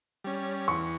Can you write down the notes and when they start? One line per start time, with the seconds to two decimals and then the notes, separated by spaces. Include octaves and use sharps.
0.24 G3 C#4
0.68 E2 C#6